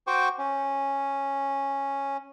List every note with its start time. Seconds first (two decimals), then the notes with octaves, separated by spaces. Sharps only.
0.07 F#4 C5 G5 C#6 D6
0.39 C#4